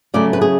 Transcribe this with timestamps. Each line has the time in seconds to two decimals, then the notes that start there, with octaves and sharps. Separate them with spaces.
0.14 C#3 F#3 A3 D5
0.33 B4
0.41 G#4